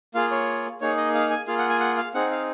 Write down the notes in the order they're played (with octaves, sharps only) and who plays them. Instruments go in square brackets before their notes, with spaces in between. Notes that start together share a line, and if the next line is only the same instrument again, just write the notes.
[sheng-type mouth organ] A#3 F4 G#4 F5
C#5
A#3 D#4 G#4 C#5
D#5
F5
G#5
A#3 F4 G#4 F5
F#5
G#5
F#5
F5
C4 D#4 G#4 F#5
F5